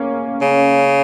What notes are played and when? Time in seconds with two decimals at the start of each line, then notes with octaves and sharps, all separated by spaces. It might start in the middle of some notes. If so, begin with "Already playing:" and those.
Already playing: A#3 C#4
0.42 C#3